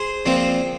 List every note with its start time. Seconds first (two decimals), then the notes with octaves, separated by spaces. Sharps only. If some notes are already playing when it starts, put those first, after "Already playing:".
Already playing: G#4 C5
0.26 A#2 F3 C4